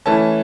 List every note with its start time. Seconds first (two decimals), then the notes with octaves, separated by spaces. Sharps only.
0.06 E3 A3 C#4 A5